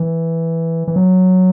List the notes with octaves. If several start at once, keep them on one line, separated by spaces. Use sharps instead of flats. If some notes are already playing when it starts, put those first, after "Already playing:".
Already playing: E3
E3
F#3